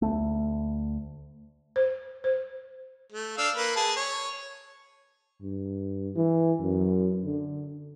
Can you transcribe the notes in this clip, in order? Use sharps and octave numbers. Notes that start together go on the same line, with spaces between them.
D2 A3
C5
C5
A3
D4 F5 E6
A#3 B4
G#4 A5
C#5
G2
E3
F#2
D3